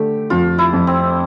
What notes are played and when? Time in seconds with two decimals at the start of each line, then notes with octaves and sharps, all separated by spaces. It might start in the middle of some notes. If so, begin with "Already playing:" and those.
Already playing: D3 A3 G4
0.30 F2 F4
0.58 E4
0.73 F2
0.87 C4